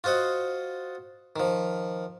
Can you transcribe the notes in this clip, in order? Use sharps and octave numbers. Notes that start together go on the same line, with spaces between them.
F4 F#4 C5 D#5 F#5
D#3 F3